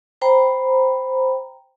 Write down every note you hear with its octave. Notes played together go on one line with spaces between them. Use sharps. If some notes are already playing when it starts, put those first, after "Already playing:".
C5 G5 A#5 B5